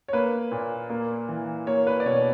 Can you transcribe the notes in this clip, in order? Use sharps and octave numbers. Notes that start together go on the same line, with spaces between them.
C#5
A#3 B4
A#2
A#3
E3
A#3 C#5
B4
D5
B2 C#5